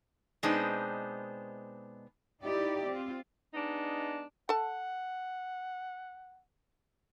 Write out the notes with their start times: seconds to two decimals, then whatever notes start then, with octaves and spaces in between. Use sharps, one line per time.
0.43 B2 G#3 B3 C4 D4 D#4
2.42 D#4 E4 G4 D5
2.87 C4 F4
3.53 G#3 B3 D4 D#4
4.49 A4 F#5 A5